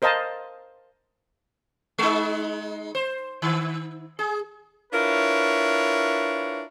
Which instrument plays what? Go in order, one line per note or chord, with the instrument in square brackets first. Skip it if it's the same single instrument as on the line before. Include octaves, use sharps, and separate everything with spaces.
[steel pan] A#4 C5 D#5 F5 A5
[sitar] G#3 D#4
C5
D#3
G#4
[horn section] D4 E4 F4 A#4 B4 C#5